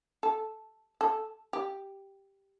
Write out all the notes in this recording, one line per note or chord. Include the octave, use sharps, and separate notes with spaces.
A4
A4
G4